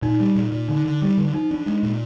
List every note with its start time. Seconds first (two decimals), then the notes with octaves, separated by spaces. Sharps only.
0.02 A#2 D#4
0.20 G3
0.35 A#2
0.52 A#2
0.68 D3 D#4
0.85 D3
1.02 G3
1.18 D3
1.34 F3 D#4
1.51 D4
1.66 G#3
1.83 A#2